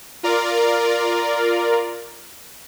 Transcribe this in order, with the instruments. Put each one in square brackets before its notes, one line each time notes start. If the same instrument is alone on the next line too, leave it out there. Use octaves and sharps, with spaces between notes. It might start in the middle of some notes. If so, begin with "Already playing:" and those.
[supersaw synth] F4 A#4 D5